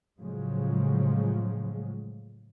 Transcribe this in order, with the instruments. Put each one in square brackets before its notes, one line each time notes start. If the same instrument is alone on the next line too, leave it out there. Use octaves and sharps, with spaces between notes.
[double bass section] A2 C#3 F3 F#3 G#3